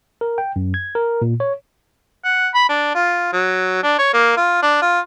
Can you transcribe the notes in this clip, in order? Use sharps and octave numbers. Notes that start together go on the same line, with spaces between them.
A#4
G5
F#2
G#6
A#4
A#2
C#5
F#5
B5
D4
F4
F#3
D4
C#5
A#3
F4
D4
F4